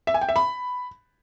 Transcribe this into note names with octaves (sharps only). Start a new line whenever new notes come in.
E5
G#5
G5
E5
B5